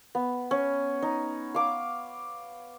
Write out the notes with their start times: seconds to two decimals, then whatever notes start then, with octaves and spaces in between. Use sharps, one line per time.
0.15 B3
0.51 C#4
1.02 D#4
1.54 F5 D6